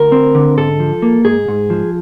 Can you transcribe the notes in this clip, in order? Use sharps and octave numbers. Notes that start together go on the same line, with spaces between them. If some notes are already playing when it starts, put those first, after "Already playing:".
Already playing: D2 A#4
C4
D3
G#2 A4
F3
A#3
G#2 G#4
G#2
F3